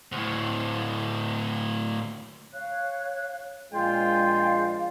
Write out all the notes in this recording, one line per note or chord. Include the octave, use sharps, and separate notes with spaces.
D2 A2
C#5 F5 F#6
A#1 F3 G#3 F4 D5 F5 G5 G#5